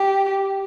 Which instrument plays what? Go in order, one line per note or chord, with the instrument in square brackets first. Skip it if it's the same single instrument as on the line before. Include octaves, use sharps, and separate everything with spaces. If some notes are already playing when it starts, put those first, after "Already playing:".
Already playing: [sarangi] G4